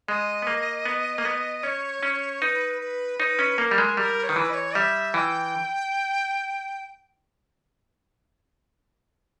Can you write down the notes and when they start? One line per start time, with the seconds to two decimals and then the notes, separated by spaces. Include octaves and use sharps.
0.08 G#3 D#5
0.42 B3
0.47 A#3
0.85 B3
1.18 A#3
1.25 B3
1.63 C#4 C#5
2.03 C#4
2.42 D#4 B4
2.81 B4
3.19 D#4 B4 C#5
3.39 C#4
3.58 A#3 A#4
3.71 G3
3.78 G#3
3.97 G3 A#4
4.23 C#5
4.28 D#3 B4
4.36 E3
4.50 D#5
4.54 C#5
4.75 G3 E5
5.14 E3 G5